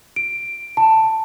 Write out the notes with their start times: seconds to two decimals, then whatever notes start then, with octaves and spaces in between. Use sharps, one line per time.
0.16 D7
0.77 A5